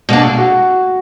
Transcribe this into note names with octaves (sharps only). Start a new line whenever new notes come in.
B2 A#3 D4
F#4